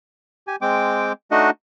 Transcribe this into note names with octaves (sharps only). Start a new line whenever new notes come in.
G4 G#5
G#3 C4 G5 D6
A3 D4 D#4 F#4 D#5 F#5